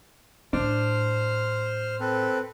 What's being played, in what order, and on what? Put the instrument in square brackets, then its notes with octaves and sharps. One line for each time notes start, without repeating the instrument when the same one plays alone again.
[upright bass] A2 [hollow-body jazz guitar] D4 [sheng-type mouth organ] C5 F6
[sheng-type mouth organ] C4 A4 B4